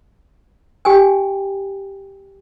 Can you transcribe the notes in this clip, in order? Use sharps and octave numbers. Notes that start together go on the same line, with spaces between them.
G4 G5 G#5